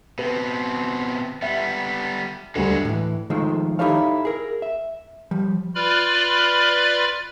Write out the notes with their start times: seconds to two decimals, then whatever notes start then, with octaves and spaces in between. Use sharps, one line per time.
0.19 B2 C4 B4
1.42 G3 B3 E5
2.55 D2 G2 G3 G#3 F#4
2.85 A2 E3
3.30 D#3 F3 G#3 A3
3.79 D#4 E4 G4 A4 C#5 F5
4.25 G#4 A#4
4.62 E5
5.31 F3 G3
5.75 F4 B4 D5 B5 F6